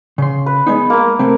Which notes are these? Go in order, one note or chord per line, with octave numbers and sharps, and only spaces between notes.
C#3 C6
B4
G#3 B3 D#4
A#3 A#4
C3 A3 C4